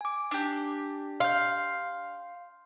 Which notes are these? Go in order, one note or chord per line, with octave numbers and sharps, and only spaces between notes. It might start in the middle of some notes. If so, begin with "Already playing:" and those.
G#5 D6
D4 G4
F5 C6 G6